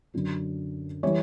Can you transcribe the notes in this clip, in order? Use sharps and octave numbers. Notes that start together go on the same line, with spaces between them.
F#2 D3 F#3
E3 G3 C#5